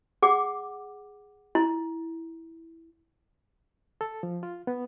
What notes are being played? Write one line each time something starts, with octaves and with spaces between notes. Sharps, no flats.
G#4 F#5 D6
E4
A4
F3
F4
B3